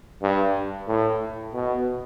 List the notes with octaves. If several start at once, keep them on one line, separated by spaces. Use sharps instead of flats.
G2
A2
B2